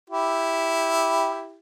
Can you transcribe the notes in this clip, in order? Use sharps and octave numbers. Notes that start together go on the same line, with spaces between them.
E4 G4